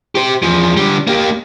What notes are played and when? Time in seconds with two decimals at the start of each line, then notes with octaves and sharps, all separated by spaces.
0.15 G4 C5
0.42 E2 F3
0.77 D3 G3
1.07 A#3 G4